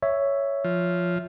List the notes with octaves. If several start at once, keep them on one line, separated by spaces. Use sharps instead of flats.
C#5 E5
F3